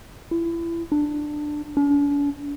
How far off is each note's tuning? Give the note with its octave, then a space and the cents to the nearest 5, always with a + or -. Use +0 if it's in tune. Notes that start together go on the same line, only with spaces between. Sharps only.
E4 +30
D4 +15
D4 -45